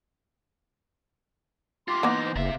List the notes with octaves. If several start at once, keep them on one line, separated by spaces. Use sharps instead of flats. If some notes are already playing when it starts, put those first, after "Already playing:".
F4 G4 C6 D6
E3 A#3 B3 D#4
C5
F#1 C3 E5 F5